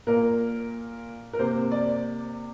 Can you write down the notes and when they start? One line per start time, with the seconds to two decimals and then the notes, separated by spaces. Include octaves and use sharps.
0.07 A#2 A#3 A#4
1.33 A#4
1.39 C3 A#3 C5
1.72 D5